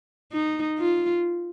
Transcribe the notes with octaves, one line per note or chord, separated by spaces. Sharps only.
D#4
F4